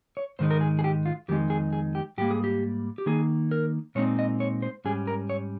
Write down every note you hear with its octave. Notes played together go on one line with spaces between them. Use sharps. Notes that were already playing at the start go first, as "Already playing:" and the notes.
C#5
G#2 D#3 G#3 D#4 C5
A#4
G#4
G#4
G4
F4
F2 D#3 G#3 D#4 G4
G#4
G#4
G4
G#2 G3 A#3 G4
G#4
G4
G4
D#3 A#3 D#4 G#4
A#4
A#2 G#3 C4 D#4 C#5
D#5
C#5
C5
G#2 G3 C#4 G#4
A#4
C#5